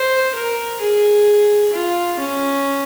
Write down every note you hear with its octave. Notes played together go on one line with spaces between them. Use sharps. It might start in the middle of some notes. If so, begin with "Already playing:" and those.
Already playing: C5
A#4
G#4
F4
C#4